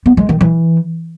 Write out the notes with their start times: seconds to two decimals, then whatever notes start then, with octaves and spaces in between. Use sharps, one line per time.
0.06 B3
0.17 G#3
0.29 D#3
0.41 E3